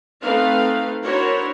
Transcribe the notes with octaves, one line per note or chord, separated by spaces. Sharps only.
A3 C4 D#4 B4 F5
D4 E4 F#4 A#4 C5 C#5